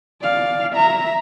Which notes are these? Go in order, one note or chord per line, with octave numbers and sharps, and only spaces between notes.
D5 F5
E5 A#5